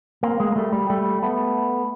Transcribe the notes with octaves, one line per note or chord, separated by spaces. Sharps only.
A#3 C4
G#3 A#3
A#3
G3 A3
G3
G3 A3
A3 B3